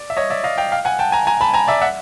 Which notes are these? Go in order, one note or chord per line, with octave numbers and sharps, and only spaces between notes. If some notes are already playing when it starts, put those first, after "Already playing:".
Already playing: D5
E5
C#5 D#5
D5 E5
D#5 F5
F5 G5
F5 G5
F#5 G#5
G5 A5
G#5 A#5
G#5 A#5
A5 B5
G#5 A#5
D5 E5
E5 F#5